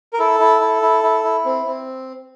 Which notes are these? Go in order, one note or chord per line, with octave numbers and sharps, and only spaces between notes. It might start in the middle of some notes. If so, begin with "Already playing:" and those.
A#4
E4 A4
E4
E4
E4
E4
E4
C4
C4